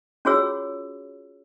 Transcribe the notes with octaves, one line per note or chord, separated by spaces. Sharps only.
C#4 F4 F#4 G#4 C#5 E6